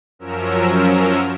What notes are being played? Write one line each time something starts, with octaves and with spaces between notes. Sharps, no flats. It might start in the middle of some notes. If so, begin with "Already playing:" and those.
F#2 F3 F#3 C#4 A#4 E6